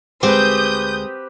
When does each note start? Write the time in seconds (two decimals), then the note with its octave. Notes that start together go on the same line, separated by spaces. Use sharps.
0.23 D2 G#3 C4 G4 B4 D#6 G6